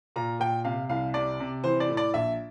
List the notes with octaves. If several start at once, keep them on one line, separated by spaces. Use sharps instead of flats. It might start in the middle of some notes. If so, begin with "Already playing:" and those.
A#2 A#5
A#2 G5
C3 F5
C2 F5
C3 D5
C3
E3 C5
D5
A2
D5
A#1 E5